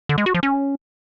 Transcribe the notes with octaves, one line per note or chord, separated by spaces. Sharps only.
D3
G#3
F#4
F3
C#4